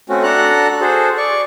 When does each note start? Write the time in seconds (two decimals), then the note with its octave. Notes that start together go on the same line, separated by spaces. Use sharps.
0.09 A3 C4 C#4 F#4
0.23 D4 F#4 A4 F#5 A#5 F#6
0.81 F#4 G#4 A4 C5
1.17 D5 C#6